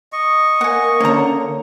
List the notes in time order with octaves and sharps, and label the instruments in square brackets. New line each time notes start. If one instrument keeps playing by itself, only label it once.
[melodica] D#5 C#6
[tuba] A#3 [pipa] F#5 G#5
[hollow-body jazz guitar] D3 A#3 [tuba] C#4 [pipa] C#5 A#5